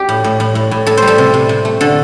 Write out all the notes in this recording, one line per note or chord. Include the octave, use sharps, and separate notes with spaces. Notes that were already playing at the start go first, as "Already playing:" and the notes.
Already playing: G4
A2
A2
A2
A2
A2
A2 A4
G3 C5
A4
C3
C3
C3
A3
D3 A4